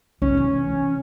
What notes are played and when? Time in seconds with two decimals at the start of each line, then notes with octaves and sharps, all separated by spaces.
0.22 B1 G2 C#4
0.34 C3 E3